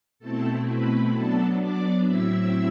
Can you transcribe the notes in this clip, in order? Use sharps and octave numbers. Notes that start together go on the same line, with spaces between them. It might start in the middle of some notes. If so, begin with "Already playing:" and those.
B2 A3 C4 E4 A4 A5
B4 B5
F#3 B3 D4 A4 A5
D5 D6
A2 F#3 C4 E4 E5 E6